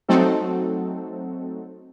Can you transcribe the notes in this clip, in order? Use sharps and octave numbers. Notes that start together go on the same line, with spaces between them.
F#3 A3 C4 D#4 F#4 A4